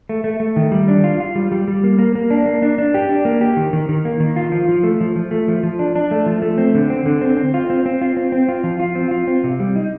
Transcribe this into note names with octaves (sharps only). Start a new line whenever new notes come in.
A3
A3
A3
D#3
G3
D4
F4
F4
G3
G3
G3
A#3
A#3
A#3
D4
A#3
D4
D4
G4
D4
A#3
G4
D#3
D#3
D#3
A#3
D#3
F4
F3
F3
A3
F3
F3
A3
F3
F3
D4
D4
A3
F3
A3
C4
D3
C4
D3
C4
C4
F4
C4
C4
F4
C4
C4
F4
F3
F4
C4
F4
C4
C3
G3
D#4